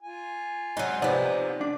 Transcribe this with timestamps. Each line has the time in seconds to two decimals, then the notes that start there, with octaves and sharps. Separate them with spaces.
0.02 F4 G#5
0.77 G#2 F#3 D#4 F#5
1.02 C3 F3 B3 D#4 D5
1.61 D4 D6